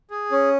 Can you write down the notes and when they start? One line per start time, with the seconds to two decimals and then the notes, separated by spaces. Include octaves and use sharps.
0.11 G#4
0.31 C#4